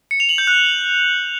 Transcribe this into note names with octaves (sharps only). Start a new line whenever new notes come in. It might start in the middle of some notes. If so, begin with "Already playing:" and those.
C#7
F7
F#7
G6
F#6